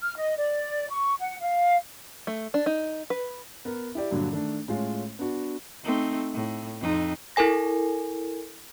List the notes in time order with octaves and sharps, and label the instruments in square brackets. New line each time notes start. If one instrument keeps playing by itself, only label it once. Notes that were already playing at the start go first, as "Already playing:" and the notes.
[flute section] F6
D#5
D5
C#6
F#5
F5
[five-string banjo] A3
D4
D#4
B4
[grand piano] B3 A#4
E4 G4 D5
G2 A#2 D3 F#3 G3
D#3 A3 D4
A2 G#3 C#4 F4
B3 D4 F#4
[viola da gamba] A3 C4 D#4
A2
F2 C4 D#4
[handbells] E4 A4 A#4 G#5 A#6